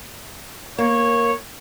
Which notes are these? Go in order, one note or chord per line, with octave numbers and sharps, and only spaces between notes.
A#3 C#5